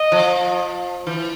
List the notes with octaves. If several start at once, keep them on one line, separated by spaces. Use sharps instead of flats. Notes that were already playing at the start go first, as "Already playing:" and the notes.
Already playing: D#5
F3
E3